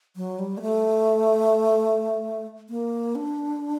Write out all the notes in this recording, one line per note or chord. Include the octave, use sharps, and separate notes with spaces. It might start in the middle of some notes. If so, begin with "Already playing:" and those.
F#3
G3
A#3
A3
A#3
D4